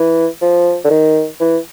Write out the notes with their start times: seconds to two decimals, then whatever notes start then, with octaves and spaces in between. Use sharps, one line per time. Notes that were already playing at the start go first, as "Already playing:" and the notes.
Already playing: E3
0.42 F3
0.84 D3
0.90 D#3
1.40 E3